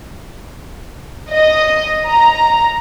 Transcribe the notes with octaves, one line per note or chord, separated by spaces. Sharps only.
D#5
A#5